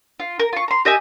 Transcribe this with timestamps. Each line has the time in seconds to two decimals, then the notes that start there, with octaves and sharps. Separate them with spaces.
0.20 F4
0.39 A#4
0.53 F4 C#6
0.68 A#5 C6
0.85 G4 D#5 E5 G#5